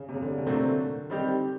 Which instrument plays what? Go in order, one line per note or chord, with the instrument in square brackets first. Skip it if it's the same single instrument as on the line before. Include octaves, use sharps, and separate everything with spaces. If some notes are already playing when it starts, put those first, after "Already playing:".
Already playing: [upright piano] C#3
C3
C#3
D3
C3
[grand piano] A#2 F#3 A3 C4 [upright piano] D3
[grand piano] D#3 G3 C4 D#4 G4